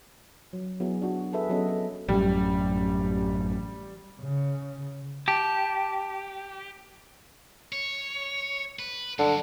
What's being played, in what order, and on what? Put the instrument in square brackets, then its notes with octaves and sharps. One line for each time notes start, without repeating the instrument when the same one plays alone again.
[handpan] F#3
F#3 B3 E4 G#4
D4 F#4
G#4 A4 B4 E5
F#3 B3 C#4 A4 D#5
A4
[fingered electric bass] A1 F#2 [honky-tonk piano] G3
[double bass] C#3
[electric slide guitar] G4 [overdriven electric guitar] A5
[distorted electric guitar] C#5
B4
[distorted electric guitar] G2 F#3 [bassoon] D3